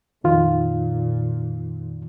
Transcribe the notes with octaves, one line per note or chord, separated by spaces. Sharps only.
F2 A#2 D#3 F4